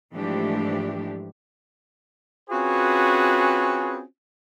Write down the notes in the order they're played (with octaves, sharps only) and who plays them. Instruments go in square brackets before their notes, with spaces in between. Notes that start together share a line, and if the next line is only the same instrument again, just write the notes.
[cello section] G#2 E3 F3 A3 D4 G4
[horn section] C4 C#4 F4 F#4 G#4 B4